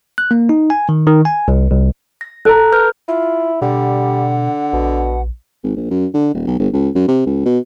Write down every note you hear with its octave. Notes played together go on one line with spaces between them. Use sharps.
F#6
A#3
D#4
G#5
D#3
D#3
G#5
C2
C2
A#6
A4 A#5 F#6
B4 F6 G6
E4 F4
B2 D3 G3 F#5
A#1 B2
G#1
A#1
F#2
D3
D#1
B1
G1
C#2
F#2
C3
C#2
B2